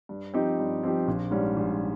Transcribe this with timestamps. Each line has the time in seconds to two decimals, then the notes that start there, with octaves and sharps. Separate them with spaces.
0.09 G2
0.34 F3 C4 D#4 G4
0.59 G2
0.83 F3 C4 D#4 G4
1.08 A#1
1.31 G#2 G3 C#4
1.56 A#1